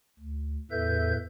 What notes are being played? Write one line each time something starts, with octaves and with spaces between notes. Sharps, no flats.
D2
E2 A2 A4 B4 E5 G6